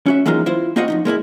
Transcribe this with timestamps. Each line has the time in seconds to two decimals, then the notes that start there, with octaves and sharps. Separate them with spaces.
0.06 C#4 F#4 E5
0.26 E3 F#3 G#3 A#3 D#4 F4
0.46 E4 F4 C5
0.76 A#3 C4 F4 F#4 D#5 F#5
0.88 F2 B2 D#4
1.05 G#3 A#3 C#4 E4